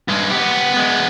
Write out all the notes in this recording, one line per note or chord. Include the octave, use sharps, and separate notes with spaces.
G2 G#3
B3 G4
G#3 B3